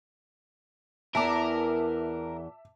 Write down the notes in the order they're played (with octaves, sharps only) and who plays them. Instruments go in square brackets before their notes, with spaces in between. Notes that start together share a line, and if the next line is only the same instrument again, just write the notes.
[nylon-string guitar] E2 E3 [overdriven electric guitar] A#4 [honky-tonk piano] E5 A5 D6